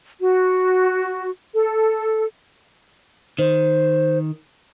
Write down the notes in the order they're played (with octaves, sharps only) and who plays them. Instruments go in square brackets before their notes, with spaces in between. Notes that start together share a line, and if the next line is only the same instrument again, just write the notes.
[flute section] F#4
A4
[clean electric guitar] D#3 [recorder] C5